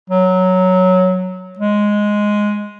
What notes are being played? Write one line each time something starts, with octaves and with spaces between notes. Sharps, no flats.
F#3
G#3